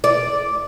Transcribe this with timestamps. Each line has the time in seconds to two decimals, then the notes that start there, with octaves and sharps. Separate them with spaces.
0.04 D5